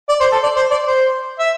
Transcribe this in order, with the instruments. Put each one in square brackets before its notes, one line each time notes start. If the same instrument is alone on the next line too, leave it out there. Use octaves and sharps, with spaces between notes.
[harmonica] D5
C5
A4
D5
C5
D5
C5
E5